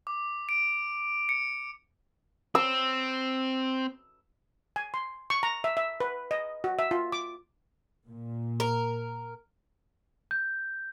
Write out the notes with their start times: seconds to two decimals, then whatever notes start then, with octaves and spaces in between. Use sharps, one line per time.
0.07 D6
0.49 D7
1.29 C#7
2.55 C4 E6
4.76 G#5
4.94 C6
5.30 C#6
5.43 A#5
5.64 E5
5.77 E5
6.00 B4
6.31 D#5
6.64 F#4
6.79 E5
6.91 F4
7.12 D6
8.07 A#2
8.60 A#4
10.31 G6